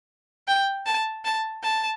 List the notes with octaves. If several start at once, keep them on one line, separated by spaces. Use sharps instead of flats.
G5
A5
A5
A5